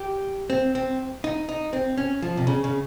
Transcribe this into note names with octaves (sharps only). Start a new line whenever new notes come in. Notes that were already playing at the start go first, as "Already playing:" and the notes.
Already playing: G4
C4
C4
D#4
D#4
C4
C#4
F3
C3
C#3
C#3